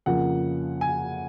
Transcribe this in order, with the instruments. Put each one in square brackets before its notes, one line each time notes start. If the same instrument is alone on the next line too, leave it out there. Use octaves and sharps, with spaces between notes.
[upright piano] F2 C#3 F3 A#3 C#4 F#5
G#5